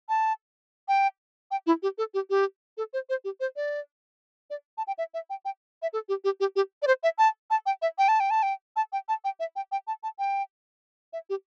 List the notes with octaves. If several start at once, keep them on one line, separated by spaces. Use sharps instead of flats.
A5
G5
G5
E4
G4
A4
G4
G4
A4
C5
C5
G4
C5
D5
D5
A5
G5
E5
E5
G5
G5
E5
A4
G4
G4
G4
G4
D5
C5
E5
A5
A5
G5
E5
G5
A5
G5
A5
G5
A5
G5
A5
G5
E5
G5
G5
A5
A5
G5
E5
G4